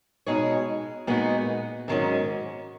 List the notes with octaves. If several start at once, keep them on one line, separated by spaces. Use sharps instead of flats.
B2 G#3 D#4 G#4 C#5
A#2 G#3 B3 D#4 F#4
G#2 D#3 F#3 C#4